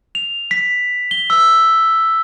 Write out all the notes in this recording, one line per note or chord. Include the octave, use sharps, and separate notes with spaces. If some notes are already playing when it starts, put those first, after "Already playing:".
F7
B6
G7
E6